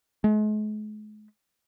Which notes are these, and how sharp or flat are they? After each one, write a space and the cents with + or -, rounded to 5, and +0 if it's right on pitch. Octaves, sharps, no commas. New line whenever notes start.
G#3 +45